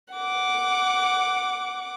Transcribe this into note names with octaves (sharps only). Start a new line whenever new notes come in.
F#5 D6